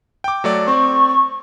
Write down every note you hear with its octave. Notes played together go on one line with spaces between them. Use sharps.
G5 D6
F#3 A3 D5
C4 D5 C#6